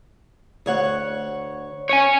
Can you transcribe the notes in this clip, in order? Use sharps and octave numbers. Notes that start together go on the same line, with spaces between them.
D2 C#5 F#5
C#5 G#5